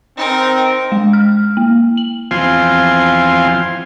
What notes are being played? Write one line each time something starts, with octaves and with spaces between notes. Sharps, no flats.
C4 D#4 A#4
G#3
F6
A#3
F#7
E2 F3 C4 F4 G#5 C6